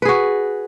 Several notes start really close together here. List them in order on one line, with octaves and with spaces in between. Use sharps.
B4 G#4 F#4